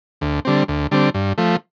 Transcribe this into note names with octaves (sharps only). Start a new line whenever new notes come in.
D2
D3 G3 C4
D2
D3 G3 C4
G2
F3 A3